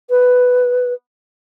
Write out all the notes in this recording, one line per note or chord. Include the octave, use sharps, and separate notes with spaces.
B4